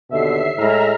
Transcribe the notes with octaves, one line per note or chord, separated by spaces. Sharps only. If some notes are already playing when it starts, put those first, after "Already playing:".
D#2 B2 D3 E5 C7
A2 G#3 E4 E5 A#5 F6